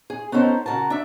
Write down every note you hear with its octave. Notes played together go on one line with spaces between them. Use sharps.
G#4
B3 C#4 D#4 A4 C5
C#3 F#4 A#4 A5
D4 E5